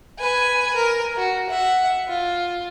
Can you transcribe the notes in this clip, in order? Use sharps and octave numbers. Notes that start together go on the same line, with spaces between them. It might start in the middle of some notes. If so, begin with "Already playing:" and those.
B4 G#5
A#4
F#4
E5 F#5
F4